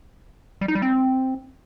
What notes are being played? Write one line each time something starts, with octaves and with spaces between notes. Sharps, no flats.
G3
D#4
G3
C4